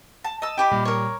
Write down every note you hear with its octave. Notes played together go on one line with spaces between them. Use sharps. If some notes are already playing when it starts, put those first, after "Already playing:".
A5
D#5 A5 E6
E4 G4 G5 B5
A#2 G3
A#4 C#5